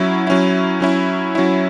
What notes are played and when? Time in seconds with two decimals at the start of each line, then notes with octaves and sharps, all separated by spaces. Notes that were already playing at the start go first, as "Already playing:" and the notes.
Already playing: F#3 C#4 E4
0.27 F#3 C#4 E4
0.81 F#3 C#4 E4
1.35 F#3 C#4 E4